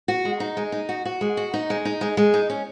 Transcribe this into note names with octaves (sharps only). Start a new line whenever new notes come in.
F#4
G#3
D#4
G#3
D#4
F#4
F#4
G#3
F#4
D#4
G#3
D#4
G#3
G#3
D#4
C#4